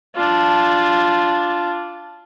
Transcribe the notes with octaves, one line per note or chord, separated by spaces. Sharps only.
D4 F4